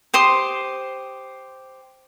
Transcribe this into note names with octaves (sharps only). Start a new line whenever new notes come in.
G4 C5 C6 D#6